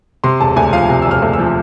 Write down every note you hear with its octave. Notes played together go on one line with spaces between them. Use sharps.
C3 C6
E1 A5
D2 G#5
F3 F5
C3 G#5
E1 E6
F6
D2
E6
F3